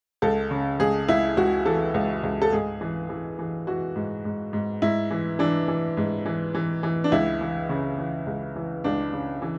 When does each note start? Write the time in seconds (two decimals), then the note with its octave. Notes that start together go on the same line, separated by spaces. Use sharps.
0.22 C#2 A4
0.51 C#3
0.80 C#2 G#4
1.08 C#2 E4
1.37 C#2 F#4
1.66 E3 A4
1.94 C#2
2.23 C#2
2.42 A4
2.52 G#2 G#4
2.81 E3
3.09 E3
3.39 E3
3.67 E3 F#4
3.96 G#2
4.25 G#2
4.53 G#2
4.82 G#2 E4
5.11 E3
5.39 E3 D4
5.68 E3
5.97 G#2
6.26 E3
6.55 E3
6.83 E3
7.04 D4
7.12 C#2 E4
7.41 E3
7.69 C#3
7.98 E3
8.26 C#2
8.56 E3
8.84 C#2 D4
9.13 C#3
9.42 E3